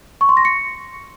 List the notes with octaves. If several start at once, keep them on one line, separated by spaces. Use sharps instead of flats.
C#6
C6
A#6
C#7